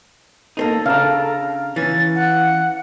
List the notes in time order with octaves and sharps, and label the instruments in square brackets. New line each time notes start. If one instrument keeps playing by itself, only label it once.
[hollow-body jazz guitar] A#3 C4 D#4 [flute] A4
[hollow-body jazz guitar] C#3 D4 [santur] F5 A#5
[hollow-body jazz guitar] E3 C#4 [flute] A6
[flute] F#5